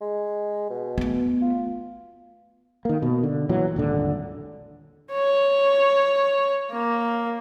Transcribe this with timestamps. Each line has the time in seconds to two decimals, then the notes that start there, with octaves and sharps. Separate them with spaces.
0.01 G#3
0.70 B2
0.98 A3 B3
1.42 F4
2.85 D#3 A#3
3.02 B2
3.23 D3
3.49 A#2 E3 F#3
3.76 D#1 G#1 D3
5.12 C#5
6.71 A#3